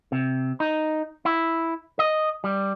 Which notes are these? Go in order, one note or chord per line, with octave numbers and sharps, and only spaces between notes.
C3
D#4
E4
D#5
G3